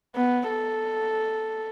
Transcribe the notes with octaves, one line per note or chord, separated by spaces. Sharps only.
B3
A4